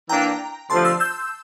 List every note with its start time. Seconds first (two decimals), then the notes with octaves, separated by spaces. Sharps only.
0.09 E3 A#3 D4 G5 A#5
0.70 D2 C3 F3 A5 C6
0.85 C6 E6
1.00 E6 G6